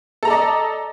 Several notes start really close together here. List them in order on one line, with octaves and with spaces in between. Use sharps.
A4 A#5 A5 D5 D#5